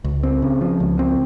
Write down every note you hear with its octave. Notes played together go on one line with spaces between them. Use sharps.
C#2
C4
C#3
F3
C#2
C4